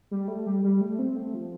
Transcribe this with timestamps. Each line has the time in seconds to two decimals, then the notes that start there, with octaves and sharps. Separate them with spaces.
0.11 G3
0.28 A3
0.46 G3
0.64 G3
0.81 A3
0.99 C4
1.17 A3
1.34 F3